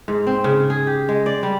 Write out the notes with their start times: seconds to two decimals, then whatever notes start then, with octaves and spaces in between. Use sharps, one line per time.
0.08 G#2
0.27 C4
0.44 C#3
0.70 G#4
0.87 G4
1.09 G#3
1.26 D5
1.43 G3